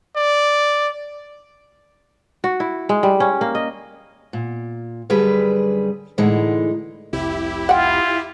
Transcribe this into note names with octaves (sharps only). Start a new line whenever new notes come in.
D5
F#4
E4
G#3
G3
C#4
A#3
D#5
A#2
F#2 D3 G3 G#4 B4
A2 D3 E3 G#3 D#4
F1 C2 E4 G4
F4 F#5 G5